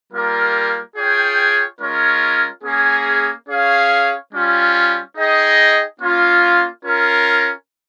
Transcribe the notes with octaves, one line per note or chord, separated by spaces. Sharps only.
G3 A#3 F4 A#4
F4 G#4 C#5 G5
G#3 C#4 F4 A#4 C#5
A#3 C#4 G#4
C#4 G#4 C#5 F5
G3 C#4 F4
D#4 G#4 D#5 G5
A#3 C#4 F4
C#4 F4 A#4